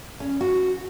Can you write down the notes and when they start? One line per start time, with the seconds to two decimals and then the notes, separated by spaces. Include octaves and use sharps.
0.20 C#4
0.41 F#4